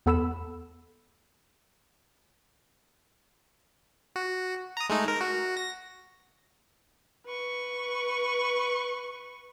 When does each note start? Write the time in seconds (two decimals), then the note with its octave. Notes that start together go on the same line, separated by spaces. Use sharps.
0.06 E2 B3 A4 B5 E6 E7
4.16 F#4
4.77 A#5 D#6
4.89 G#3 A3 D#4
5.08 A#4
5.21 F#4
5.57 A#6
7.26 B4 C#6